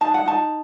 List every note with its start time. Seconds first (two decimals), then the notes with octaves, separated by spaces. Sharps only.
0.01 D#4 A5
0.14 F#5
0.26 D#4 A5